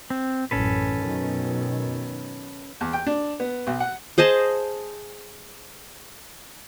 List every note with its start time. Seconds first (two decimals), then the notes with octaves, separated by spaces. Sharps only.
0.10 C4
0.51 A1 F#2 C#4 A4 B4
1.00 F#2 B2 D#3
2.81 E2
2.93 G5
3.07 D4
3.40 B3
3.67 B1
3.80 F#5
4.18 G#4 C5 D#5 A5